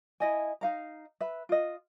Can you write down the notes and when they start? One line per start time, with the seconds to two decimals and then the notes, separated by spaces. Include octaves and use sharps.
0.20 E4 D#5 G#5
0.61 D#4 F5 A#5
1.21 B4 E5
1.49 F4 D#5